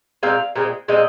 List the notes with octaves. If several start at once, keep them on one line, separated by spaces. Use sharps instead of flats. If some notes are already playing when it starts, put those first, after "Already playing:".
A#2 G#3 C4 F5
A#2 G#3 C4
A#2 G#3 C4 D#5